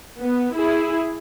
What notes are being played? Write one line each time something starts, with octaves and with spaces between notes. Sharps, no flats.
B3
E4 G#4